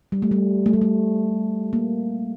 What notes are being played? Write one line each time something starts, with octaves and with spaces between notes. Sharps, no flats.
G3
A3
G3
A3
G3
A3
A#3